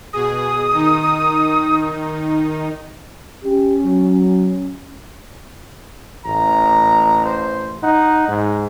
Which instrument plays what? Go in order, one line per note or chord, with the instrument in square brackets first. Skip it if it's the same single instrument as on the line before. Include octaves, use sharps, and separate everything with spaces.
[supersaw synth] B2 G#4 [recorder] D#6
[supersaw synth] D#3 D#4
[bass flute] C#4 [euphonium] G4
[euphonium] F#3
[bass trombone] A1 [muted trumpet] A#5
[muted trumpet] C5
[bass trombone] D#4 [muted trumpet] F#5
[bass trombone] G#2